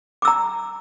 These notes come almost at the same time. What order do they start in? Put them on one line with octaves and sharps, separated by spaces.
D6 E6 A#5